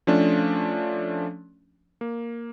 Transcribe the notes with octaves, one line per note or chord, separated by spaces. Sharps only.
F3 A3 C#4 D4
A#3